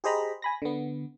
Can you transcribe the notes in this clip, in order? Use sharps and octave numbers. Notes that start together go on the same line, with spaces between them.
G4 G#4 C5 D#5 A#5 B5
G#5 B5 A#6
D3 B3